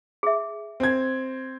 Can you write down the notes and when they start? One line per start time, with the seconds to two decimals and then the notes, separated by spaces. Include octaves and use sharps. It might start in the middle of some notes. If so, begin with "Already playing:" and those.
0.23 G#4 E5
0.80 C4 G#6